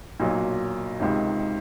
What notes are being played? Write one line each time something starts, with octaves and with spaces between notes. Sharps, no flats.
B1 A#2 F#3
C#2 C3 D#3